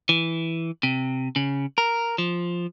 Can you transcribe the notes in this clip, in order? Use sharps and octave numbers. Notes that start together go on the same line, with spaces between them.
E3
C3
C#3
A#4
F3